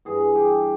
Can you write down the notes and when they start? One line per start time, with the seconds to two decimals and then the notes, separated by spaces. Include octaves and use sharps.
0.05 G2 E3 G#4
0.20 G#4
0.35 G4